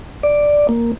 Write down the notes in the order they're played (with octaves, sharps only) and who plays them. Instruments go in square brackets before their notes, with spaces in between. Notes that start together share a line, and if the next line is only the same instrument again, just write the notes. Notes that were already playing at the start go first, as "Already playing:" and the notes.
[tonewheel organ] D5
A#3